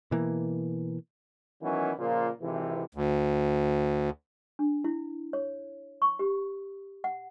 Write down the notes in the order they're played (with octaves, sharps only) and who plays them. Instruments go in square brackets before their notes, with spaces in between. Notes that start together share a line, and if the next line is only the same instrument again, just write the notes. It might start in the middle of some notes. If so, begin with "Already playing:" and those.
[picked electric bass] B2 E3 A#3
[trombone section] D#3 E3 F#3 B3 C#4
A#2 C#3 F3 A#3 F4
G#1 C3 E3
[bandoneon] D2
[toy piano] D4
E4
C#5
C#6
G4
F#5